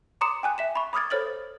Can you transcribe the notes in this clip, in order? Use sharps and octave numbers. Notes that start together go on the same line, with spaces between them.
A#5 C6 D6 D#6 C#7 E7
G5 G#5 F#6
E5 B6 E7
B5 C#6
B5 D6 D#6 F6 G#6 A6
A4 C5 C#5 F6 A6 F#7